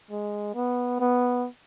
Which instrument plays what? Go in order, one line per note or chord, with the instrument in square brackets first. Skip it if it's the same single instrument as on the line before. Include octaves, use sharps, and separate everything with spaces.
[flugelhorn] G#3
B3
B3